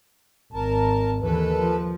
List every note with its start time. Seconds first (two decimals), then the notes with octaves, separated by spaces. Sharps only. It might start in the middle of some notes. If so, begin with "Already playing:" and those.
0.53 G#1 A#4 A5
1.22 D#2 E3 A4 B4
1.56 F3